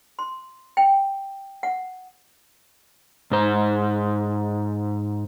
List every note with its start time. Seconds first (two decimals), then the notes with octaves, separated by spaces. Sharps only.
0.19 C6
0.77 G5
1.63 F#5
3.31 G#2 C5